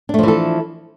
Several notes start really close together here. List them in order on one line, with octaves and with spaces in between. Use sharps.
D4 A3 F3 E3 A4